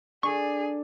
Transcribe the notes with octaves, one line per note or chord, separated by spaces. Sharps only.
D4 G#4 A4 C#6